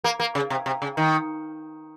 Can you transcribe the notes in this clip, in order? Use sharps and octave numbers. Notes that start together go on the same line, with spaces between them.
A#3
A#3
C#3
C3
C3
C#3
D#3